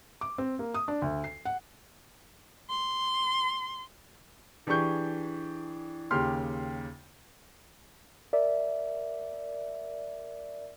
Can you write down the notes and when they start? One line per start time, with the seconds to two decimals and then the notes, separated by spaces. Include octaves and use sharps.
0.21 D6
0.38 C4
0.59 A#3
0.74 D#6
0.88 D4
1.02 D2
1.24 C7
1.45 F#5
2.69 C6
4.67 E3 D4 G4 G#4 C#6 G6
6.11 D#2 C#3 G4 C6 F6
8.33 A#4 D5 E5